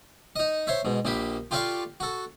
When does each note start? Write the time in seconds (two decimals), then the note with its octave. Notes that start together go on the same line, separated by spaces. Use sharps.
0.36 D#4 D#5
0.67 C5 C#5 E5
0.85 G#2 B2
1.05 A#1 A#3 G4 B5
1.51 F4 G4 A4 D5 F5 C#6
2.00 F#4 A4